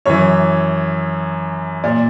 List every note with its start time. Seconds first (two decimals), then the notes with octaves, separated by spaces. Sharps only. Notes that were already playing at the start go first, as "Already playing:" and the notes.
0.05 F#2 E3 C#5
1.84 A#2 D5